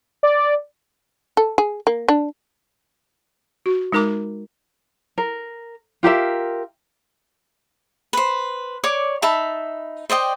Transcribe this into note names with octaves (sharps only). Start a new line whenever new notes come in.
D5
A4
G#4
A#3
D4
F#4
G#3 D#4 A#4 A#5 D6
A#4
F4 G4 A#4 E5
B4 C5
C#5 D5 D6
D#4 E5 A5 B5
C5 D5 D#5 G5